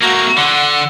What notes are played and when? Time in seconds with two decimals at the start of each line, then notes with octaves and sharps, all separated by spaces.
0.03 A3 A#3 F#4 A#5
0.38 D3 F#5 C6